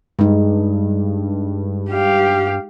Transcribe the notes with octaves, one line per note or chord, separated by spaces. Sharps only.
G2 G#3 D#4
G4 F5